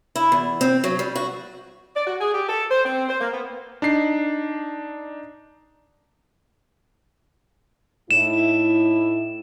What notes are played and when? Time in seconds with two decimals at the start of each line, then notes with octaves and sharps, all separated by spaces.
0.16 E4
0.32 E2
0.61 C4
0.84 F#3
0.99 G3
1.16 F#4
1.96 D5
2.07 F#4
2.21 G#4
2.34 G4
2.49 A4
2.71 C5
2.85 C4
3.09 C5
3.21 A#3
3.34 B3
3.82 D4 D#4 C7
8.11 A2 D#4 E4 E7